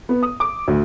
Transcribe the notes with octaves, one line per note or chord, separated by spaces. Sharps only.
B3
D#6
D6
D2